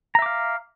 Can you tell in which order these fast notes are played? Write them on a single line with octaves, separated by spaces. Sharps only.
A#5 E5 D6 F5